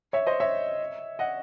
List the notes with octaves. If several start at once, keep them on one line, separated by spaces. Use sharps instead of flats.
C#5 E5
C5 D#5
C#5 E5
D#5 F#5